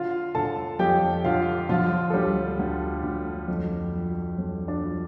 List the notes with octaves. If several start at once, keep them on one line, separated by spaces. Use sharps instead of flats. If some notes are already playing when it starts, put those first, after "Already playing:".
Already playing: D3 F4 F5
D3 A4 A5
F2 G4 G5
D3 F4 F5
D3 F3 F4
A4
D2 G3 G4
D2
D2
F2
F3
F2
D4
F3